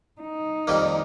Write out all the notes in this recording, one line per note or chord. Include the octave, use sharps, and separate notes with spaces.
D#4
F2 D#3 G3 A#3